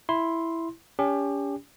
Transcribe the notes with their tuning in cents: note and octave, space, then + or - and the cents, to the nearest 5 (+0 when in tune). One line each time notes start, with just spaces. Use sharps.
E4 +0 C6 +5
C#4 +40 G4 +30